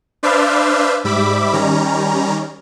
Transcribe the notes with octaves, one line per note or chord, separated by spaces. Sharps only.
D4 B4 C5 D5 E5 F5
G#2 G3 E5 B5 D6 B6
D#3 G3 C#4 A#5